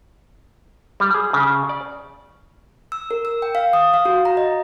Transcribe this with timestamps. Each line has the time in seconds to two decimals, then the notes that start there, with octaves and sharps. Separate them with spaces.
1.00 G3
1.14 G#4
1.33 C#3
1.69 D5
2.92 E6
3.11 A#4
3.25 E6
3.42 G5
3.55 F5
3.73 D#6
3.94 F5
4.05 F#4
4.25 A#5
4.37 D#5